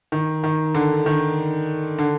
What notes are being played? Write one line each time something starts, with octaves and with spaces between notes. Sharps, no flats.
D#3
D#3
D3
D#3
D3